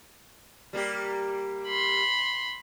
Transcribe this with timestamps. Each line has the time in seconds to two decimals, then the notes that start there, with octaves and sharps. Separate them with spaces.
0.73 G3 A#3 G4
1.67 B5 C6